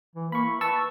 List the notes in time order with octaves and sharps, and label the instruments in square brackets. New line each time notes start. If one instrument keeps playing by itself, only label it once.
[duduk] E3
[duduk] A#3 [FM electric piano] B5 C#6
[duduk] E4
[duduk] B4 [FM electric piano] A5 C#6 E6